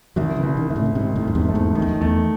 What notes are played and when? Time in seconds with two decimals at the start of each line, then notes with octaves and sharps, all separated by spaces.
0.16 C2 D#3 F#3
0.36 C#3 E3
0.43 C2
0.57 C3 D#3
0.69 C2 D#3
0.76 A2 C#3
0.86 C#3
0.95 G#2 C3 D#3
1.16 F#2 A2
1.22 C3
1.28 F#2
1.35 E2 G#2
1.49 F#2 A3
1.55 E2 G#2
1.75 F#2 D#3
1.82 E2
1.89 F#2
2.01 E2 A3